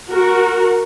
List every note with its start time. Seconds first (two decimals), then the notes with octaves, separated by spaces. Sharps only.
0.10 F#4 A#4